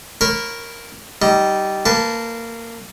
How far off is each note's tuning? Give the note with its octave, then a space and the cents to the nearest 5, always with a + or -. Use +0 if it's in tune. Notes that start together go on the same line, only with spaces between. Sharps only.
A#4 +0 C#5 -30 B5 +0
G3 -15 D#4 +0
A#3 -20 B4 +0 A5 +0